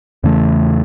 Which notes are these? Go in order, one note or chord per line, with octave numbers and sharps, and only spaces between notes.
E2 C#3 E3 A3